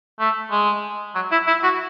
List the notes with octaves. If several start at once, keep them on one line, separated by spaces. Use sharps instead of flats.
A3
G#3
F#3
E4
E4
F#4